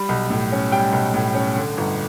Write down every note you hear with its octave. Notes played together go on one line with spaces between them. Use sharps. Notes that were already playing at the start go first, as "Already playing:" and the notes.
Already playing: G3 B5
B1
A2
C#4
G3 G5
B1
A2
C#4
D3
G1